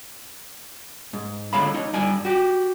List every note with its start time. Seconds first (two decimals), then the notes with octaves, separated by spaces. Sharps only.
1.13 G#2
1.53 D3 G#3 C#5 F5 B5
1.74 D#4 C#5
1.93 G2 D5 G#5
2.25 F#4 G4